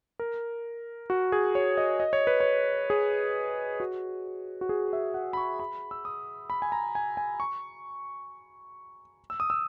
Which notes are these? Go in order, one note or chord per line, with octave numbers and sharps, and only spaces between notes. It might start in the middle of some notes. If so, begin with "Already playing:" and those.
A#4
F#4
G#4
C#5
D#5
D#5
C#5
B4
C#5
G#4
F#4
F#4
G#4
E5
F#5
B5
C#6
B5
E6
D#6
B5
G#5
A#5
G#5
G#5
C#6
E6
D#6
E6